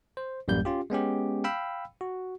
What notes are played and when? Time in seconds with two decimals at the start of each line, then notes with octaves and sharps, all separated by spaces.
0.17 C5
0.48 A1 F#2 G3 A#3 G6
0.65 C#4 F4 G4
0.90 G#3 B3 C#4 G4
1.44 F5 G5 B5 E6
2.01 F#4